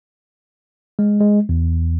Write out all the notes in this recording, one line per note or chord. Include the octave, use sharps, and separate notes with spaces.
G#3
G#3
E2